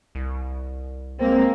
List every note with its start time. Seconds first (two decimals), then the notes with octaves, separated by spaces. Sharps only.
0.15 C2
1.19 G#3 A#3 C4